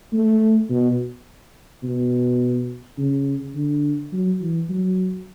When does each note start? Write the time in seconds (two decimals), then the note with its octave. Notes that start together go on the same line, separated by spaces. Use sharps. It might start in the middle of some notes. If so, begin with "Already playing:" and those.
0.13 A3
0.70 B2
1.83 B2
2.98 C#3
3.55 D3
4.13 F#3
4.42 E3
4.70 F#3